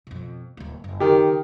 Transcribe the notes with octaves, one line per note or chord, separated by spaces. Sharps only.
F2 B2
D1 A#3
F#1
D#3 G4